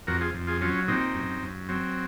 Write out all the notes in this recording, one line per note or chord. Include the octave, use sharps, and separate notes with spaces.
F2 F#4 A#4
F4 G#4
F2
F4 G#4
F#3 C#4 F4
A#2 C4 D#4
F#2
F#2
F#3 C4